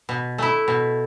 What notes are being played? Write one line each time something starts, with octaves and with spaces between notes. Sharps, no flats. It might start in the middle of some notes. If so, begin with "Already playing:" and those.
B2
A3 E4
B2